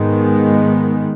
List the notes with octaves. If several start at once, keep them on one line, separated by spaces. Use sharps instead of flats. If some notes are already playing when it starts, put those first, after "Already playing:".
Already playing: G#2 D#3 G#3 B3